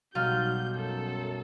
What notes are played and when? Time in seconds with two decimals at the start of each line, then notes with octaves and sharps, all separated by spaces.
0.15 B1 G3 F4 F#4 F6 G6
0.75 F#2 A4